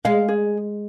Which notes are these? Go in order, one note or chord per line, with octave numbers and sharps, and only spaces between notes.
G#3 F5
G#4